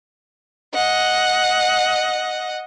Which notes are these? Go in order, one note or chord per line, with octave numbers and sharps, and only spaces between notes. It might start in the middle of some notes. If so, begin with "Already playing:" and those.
D#5 F#5